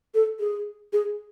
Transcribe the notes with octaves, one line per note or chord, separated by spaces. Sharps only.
A4
G#4
G#4